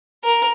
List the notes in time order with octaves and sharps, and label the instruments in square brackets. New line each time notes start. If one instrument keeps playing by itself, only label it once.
[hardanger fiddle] A#4